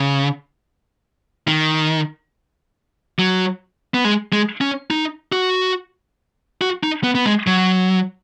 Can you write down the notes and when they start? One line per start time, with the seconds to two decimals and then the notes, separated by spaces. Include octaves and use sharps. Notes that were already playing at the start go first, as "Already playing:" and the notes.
Already playing: C#3
1.48 D#3
3.19 F#3
3.94 B3
4.05 G#3
4.33 G#3
4.61 C#4
4.90 D#4
5.32 F#4
6.61 F#4
6.83 D#4
7.04 B3
7.15 B3
7.26 G#3
7.47 F#3